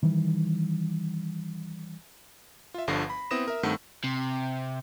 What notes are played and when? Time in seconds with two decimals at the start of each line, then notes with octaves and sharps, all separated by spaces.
0.03 D#3 E3 G3
2.74 F4 E5
2.87 G1 G2 D3 F3 A#6 C7
3.10 B5
3.31 B3 C4 E4 D#6 A#6 E7
3.48 A#4 E5
3.63 G2 D#3 A3 C4 F#5 E6
4.04 C3